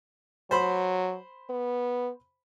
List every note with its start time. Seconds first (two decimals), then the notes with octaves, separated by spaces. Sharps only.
0.51 F#3 C5 B5 C6
1.50 B3